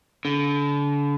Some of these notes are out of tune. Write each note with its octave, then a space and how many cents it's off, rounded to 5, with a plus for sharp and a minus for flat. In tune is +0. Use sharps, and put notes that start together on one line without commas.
D3 -35